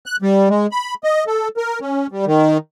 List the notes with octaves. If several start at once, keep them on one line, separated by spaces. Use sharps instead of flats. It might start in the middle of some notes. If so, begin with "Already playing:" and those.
F#6
G3
G#3
B5
D#5
A4
A#4
C#4
G3
D#3